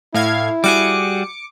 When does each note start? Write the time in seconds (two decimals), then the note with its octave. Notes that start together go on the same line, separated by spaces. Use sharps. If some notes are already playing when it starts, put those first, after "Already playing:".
0.14 A2 E4 F5 G#6
0.64 G3 F#4 G#4 D6 C#7